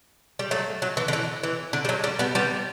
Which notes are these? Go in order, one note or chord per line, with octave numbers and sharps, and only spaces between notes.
G3
F#3 A3
F#3
E3
D3
E3
E3
D3
G3
F#3
G3
G3 B3
G3 B3